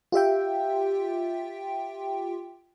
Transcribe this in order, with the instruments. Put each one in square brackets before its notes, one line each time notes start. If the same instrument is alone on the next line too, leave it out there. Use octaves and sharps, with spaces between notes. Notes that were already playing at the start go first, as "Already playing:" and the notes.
[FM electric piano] F4 G4 E5 G5